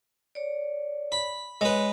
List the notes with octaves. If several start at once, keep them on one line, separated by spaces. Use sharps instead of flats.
C#5 D5
B5
G#3 B4 C#5